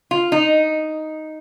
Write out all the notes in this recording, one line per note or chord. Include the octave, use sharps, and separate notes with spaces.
F4
D#4